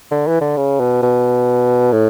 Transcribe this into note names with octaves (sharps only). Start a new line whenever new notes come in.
D3
E3
D3
C#3
B2
B2
A2